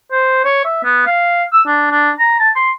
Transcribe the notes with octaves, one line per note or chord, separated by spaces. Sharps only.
C5
C#5
E5
B3
F5
E6
D4
D4
A#5
A5
C6